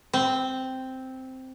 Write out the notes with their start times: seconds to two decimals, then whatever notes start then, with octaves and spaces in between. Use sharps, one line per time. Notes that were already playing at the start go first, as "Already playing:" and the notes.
0.13 C4